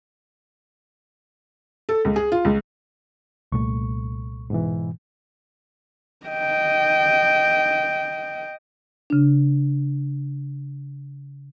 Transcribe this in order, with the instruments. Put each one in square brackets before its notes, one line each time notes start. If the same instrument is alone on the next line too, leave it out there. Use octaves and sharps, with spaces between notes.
[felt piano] A4
C#2
G#4
F4
C#2
[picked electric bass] C2 A#2 A3 [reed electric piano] C#6
[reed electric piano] G#2 B2 E3
[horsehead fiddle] D#5 G5
[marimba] C#3 D4